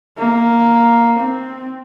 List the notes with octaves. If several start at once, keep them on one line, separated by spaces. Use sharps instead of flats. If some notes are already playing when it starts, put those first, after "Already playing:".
A#3
C4